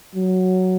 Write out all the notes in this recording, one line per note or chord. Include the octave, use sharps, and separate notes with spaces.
F#3